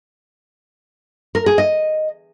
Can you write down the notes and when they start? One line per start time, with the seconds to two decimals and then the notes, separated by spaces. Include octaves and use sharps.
1.35 A#4
1.46 G#4
1.58 D#5